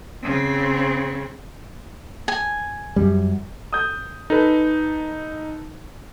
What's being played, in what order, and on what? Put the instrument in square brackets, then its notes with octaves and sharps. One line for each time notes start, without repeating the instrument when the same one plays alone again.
[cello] C#3 C4
[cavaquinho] G#5
[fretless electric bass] F#2 G3
[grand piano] D#6 G6
[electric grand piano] D#4 [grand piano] A4 B4